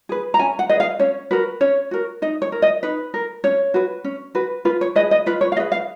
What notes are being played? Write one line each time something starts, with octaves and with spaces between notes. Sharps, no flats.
G#4 B4
A#5
C#4 G#5
F#5
G#4 B4 D#5
F5
C#4 C#5
F#4 A#4 B4
C#4 C#5
F#4 A#4
D#4 D#5
C#5
A#4
D#5
D#4 B4
A#4
C#4 C#5
F#4 B4
C#4
F#4 B4
F4 B4
C#5
G#4 B4 D#5
D#5
F4 B4
C#5
F5
G#4 B4 D#5
F5